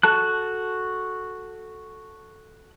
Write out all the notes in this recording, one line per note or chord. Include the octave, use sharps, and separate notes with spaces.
F#4 A4 A5 F#6